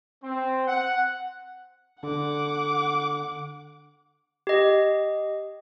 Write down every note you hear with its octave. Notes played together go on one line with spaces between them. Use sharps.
C4
F#5
D3 F#5 D6
G4 D#5